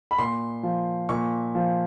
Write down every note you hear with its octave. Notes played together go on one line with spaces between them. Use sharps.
B5
A#2 C6
F3
A#2 C#6
F3